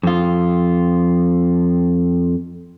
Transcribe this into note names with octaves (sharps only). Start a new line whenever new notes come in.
F2 F4